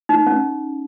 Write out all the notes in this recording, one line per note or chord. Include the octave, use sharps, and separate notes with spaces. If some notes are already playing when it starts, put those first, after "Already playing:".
D#4
C#4